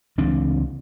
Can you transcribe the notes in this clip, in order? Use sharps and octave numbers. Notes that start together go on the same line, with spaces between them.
C#2 E3 C4 D4